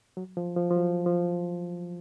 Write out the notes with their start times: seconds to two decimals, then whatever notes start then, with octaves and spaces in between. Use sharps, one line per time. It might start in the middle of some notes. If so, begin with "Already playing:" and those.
0.17 F#3
0.37 F3
0.57 F3
0.71 F3
0.76 F#3
1.06 F3